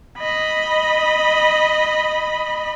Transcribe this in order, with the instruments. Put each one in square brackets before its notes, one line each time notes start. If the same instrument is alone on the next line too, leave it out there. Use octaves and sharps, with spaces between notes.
[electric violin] D#5 B5